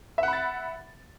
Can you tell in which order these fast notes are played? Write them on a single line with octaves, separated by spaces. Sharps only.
E5 F#5 B5 A6